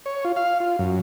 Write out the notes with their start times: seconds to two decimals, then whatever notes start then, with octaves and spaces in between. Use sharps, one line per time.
0.06 C#5
0.25 F4
0.36 F5
0.60 F4
0.79 F#2